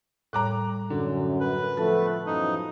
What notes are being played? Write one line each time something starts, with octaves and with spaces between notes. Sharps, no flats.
A2 G3 A#5 D6 F#6
F#2 D3
B4
F3 A3 B3 A4 A5 F#6
F#2 E3 F3 D#4